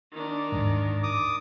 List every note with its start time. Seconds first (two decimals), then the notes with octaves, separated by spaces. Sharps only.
0.12 D#3 D4
0.52 D#2 G#2
1.03 D6 D#6